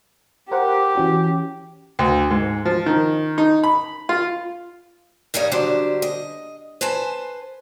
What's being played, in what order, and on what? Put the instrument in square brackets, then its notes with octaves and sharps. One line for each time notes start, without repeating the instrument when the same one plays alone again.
[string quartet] G4 [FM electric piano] A#4 C5 F#5
[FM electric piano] E3 C#4 F#4
[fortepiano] D2
G#2
F3
D#3
D#4
B5
F4
[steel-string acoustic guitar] G2 G3 D#4 C#5 D#5
D3 F#3 G3 D4 C5
D#5
B4 C5 G#5 A5